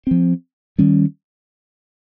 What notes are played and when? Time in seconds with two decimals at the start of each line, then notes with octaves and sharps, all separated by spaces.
0.07 F3 C4
0.79 D#3 G3 C#4